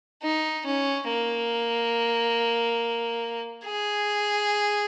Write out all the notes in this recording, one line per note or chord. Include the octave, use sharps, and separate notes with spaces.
D#4
C#4
A#3
G#4